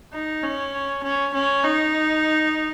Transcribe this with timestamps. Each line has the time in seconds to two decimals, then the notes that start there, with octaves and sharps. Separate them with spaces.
0.13 D#4
0.43 C#4
1.04 C#4
1.34 C#4
1.64 D#4